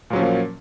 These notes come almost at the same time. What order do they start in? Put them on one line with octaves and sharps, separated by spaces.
A#2 F#3 C#4 F3 A#3